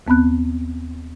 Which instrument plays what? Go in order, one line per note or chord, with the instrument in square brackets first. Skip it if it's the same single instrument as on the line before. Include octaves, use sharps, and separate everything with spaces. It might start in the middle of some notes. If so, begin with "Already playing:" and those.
[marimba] D#2 B3 C4 B5 F#6